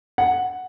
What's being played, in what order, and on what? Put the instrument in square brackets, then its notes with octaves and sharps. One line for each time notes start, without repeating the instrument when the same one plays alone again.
[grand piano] F#5